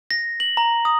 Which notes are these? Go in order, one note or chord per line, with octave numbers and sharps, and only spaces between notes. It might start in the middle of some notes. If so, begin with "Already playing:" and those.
A#6
F#7
A#5
D#6